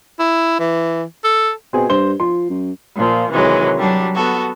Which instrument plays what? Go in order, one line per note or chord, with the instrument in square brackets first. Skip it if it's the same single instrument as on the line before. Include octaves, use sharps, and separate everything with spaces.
[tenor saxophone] E4
E3
A4
[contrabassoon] B2 [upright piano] C4 G#4
[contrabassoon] G2 [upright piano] C5 G7
[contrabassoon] F3 [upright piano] C6
[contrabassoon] F#2
[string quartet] A#2 F3
C3 D#3 E3 F#3 G#3
F#3 G3 D4
B3 F#4 A4